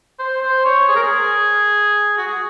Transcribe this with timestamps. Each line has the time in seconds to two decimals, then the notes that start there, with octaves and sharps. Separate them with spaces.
0.19 C5
0.42 C5
0.65 C#5
0.88 G#4
0.96 A#4
1.03 G#4
2.18 F#4
2.27 G#4